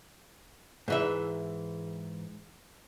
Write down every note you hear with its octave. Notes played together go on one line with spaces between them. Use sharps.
G#2 E3 E5